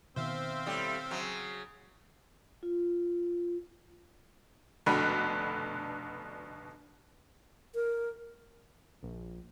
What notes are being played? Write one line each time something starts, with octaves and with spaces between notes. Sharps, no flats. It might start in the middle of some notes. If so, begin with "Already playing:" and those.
B2 D#3 C4 C5 E5 F5
A2 G3
C#3 F#3
F4
F1 B2 D3 D4 B5
A#4
A#1